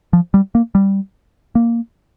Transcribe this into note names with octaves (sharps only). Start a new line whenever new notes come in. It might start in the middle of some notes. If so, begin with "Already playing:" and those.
F3
G3
A#3
G3
A#3